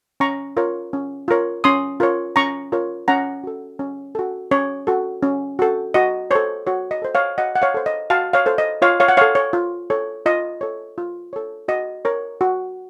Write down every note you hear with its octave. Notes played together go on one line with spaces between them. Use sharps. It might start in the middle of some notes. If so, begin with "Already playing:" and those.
C#4 A#5 C#6
F4 A#4 C#5
C#4
F4 A#4 C#5
C#4 C6 D#6
F4 A#4 C#5
C#4 A#5 C#6
F4 A#4 C#5
C#4 F#5 A#5
F#4 A4
C#4
F#4 A4
C#4 C#5
F#4 A4
C#4
F#4 A4
F#4 D#5
A4 C5 C#5
F#4 C#5
D#5
A4 C5
C#5 F5
F#4 D#5 F#5
F#5
C#5 F5
A4 C5
D#5
F#4 F5 A5
C#5 F5
A4 C5
D#5
F4 C#5 F5
C#5 F5
F#5
A4 C#5 F5
C#5
F4
A4 C#5
F4 D#5
A4 C#5
F4
A4 C#5
F#4 D#5
A#4 C#5
F#4